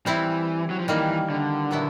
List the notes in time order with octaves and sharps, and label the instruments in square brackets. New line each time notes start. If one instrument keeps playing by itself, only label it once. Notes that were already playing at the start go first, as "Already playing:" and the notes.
[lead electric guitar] E3 [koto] G3 C4 E4
[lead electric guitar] F#3
F3
[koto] D#3 G3 A#3 [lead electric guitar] E3
[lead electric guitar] D3
[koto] A#2 F#3 B3 E4